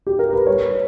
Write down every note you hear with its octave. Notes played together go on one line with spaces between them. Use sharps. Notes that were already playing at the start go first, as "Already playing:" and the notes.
G4
A#4
B4
G3 C#5